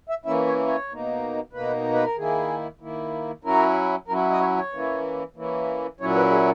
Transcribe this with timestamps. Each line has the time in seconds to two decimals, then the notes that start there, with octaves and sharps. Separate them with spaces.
0.09 E5
0.25 E3 A#3 C#4 E4 E5
0.47 C#5
0.67 C#5
0.89 B2 A#3 D#4
1.53 B2 A#3 D#4 B4
1.93 B4
2.04 A#4
2.17 D#3 A#3 E4 G#4
2.80 D#3 A#3 E4
3.44 F#3 C#4 E4 A#4
4.08 F#3 C#4 E4 A#4
4.30 D#5
4.40 C#5
4.57 C#5
4.73 E3 A#3 C#4 E4
5.36 E3 A#3 C#4 E4
6.00 A#2 F#3 C#4 E4 C#5
6.16 B4
6.31 G#4